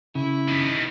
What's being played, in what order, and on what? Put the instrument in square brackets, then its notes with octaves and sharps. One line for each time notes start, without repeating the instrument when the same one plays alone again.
[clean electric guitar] C#3 [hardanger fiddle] E4
[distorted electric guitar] D#3 B3